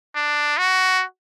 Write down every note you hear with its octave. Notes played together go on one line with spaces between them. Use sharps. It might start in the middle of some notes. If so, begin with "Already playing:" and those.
D4
F#4